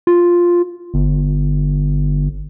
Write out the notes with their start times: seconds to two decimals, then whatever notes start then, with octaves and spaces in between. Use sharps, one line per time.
0.07 F4
0.94 G1